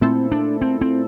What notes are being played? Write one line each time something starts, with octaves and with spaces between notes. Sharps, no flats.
A#2 A3 C4 E4 A4 C5
D4
C4
C4